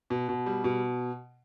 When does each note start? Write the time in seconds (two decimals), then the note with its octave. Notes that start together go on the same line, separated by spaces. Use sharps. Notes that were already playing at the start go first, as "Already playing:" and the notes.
0.10 B2
0.29 B2
0.46 G3
0.64 B2